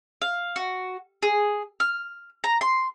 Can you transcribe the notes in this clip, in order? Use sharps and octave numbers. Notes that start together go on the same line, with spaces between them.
F5
F#4
G#4
F6
A#5
C6